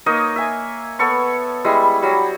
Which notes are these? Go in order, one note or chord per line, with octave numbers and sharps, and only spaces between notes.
A#3 D#4 C#5 D#5
E5 G#5
B3 A4 C#5 C#6
G3 G#3 E4
F#3 G3